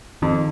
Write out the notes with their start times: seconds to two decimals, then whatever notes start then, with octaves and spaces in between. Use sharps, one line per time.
0.22 F2 D#3